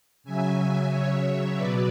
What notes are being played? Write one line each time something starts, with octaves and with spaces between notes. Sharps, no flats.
C#3 F#3 E5 G#5
C#5 E5
B2 F#3 B4 D5